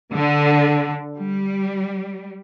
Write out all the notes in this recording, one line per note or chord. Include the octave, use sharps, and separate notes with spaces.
D3
G3